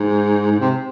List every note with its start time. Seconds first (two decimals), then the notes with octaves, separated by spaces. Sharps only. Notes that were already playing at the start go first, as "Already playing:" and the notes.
Already playing: G#2
0.51 G#2
0.60 C3